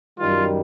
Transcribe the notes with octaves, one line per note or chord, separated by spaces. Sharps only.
F#2 D#3 G3 F4